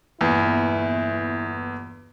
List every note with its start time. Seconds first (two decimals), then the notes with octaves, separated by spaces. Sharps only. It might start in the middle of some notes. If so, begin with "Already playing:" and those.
0.21 G1 E2 A#2 E4